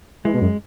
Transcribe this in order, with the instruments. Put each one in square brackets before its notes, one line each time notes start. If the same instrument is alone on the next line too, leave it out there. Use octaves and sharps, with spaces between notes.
[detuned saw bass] E3 [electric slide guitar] G#3
[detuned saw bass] B2
F#2